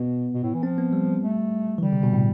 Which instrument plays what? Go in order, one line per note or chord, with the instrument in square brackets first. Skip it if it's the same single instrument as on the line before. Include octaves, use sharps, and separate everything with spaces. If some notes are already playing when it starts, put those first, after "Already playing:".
Already playing: [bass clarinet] B2 [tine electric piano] B3
[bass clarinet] B2
A2
E3
[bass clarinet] F3 [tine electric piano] C4
[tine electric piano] B3
G3
[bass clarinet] A3
[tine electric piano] E3
[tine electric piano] D3 [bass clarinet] G3
[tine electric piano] C3
B2
A2